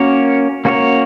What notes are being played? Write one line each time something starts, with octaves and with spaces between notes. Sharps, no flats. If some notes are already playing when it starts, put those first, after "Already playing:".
Already playing: A#3 C#4 F#4 A#4 C#5
A#3 C#4 F#4 A#4 C#5